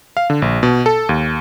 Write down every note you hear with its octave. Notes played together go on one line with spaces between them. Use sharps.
F5
D3
A#1
B2
A4
D#2